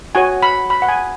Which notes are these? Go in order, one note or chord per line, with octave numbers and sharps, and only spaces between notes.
F#4 C#5 G#5
B5
B5
F#5
G#5